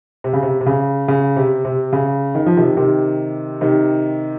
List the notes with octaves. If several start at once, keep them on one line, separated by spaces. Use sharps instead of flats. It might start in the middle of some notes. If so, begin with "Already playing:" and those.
C3
C#3
C3
C3
C#3
C#3
C3
C3
C#3
D#3
F3
C3 D#3
C3 D#3
C3 D#3